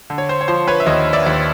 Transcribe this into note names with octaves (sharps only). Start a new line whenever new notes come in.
D3
C#5
C5
C#5
F3 C5
B4 C#5
E5
D#2 C#5 D#5
D5 E5
D#2